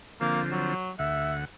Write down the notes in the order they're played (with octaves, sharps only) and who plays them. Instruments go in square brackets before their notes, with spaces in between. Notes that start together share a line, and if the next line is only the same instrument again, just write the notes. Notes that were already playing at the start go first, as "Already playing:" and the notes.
[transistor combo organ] D3 F3 C4 [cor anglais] A#3
[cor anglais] F#3
[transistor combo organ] D2 F#5 [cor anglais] E5